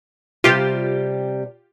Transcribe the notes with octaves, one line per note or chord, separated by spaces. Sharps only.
C3 G3 F4 G4